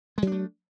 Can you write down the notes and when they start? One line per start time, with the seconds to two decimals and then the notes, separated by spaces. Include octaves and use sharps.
0.18 G#3
0.22 F#3
0.27 D4
0.32 A3